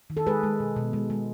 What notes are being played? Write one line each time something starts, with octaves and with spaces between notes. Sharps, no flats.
D#3
A4
G#3 G#4 B4
G#3
B2
B2
G#3
G#3